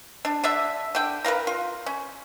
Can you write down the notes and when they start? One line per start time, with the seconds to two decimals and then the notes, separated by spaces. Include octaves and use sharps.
0.25 D4
0.44 D3 D4 E5
0.95 D3 G5
1.24 A#4 B4 F5 A#5
1.47 F4
1.86 C#4